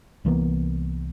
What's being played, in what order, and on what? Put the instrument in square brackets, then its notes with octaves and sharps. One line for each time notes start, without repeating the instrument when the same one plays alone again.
[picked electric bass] C2 E3 A#3 B3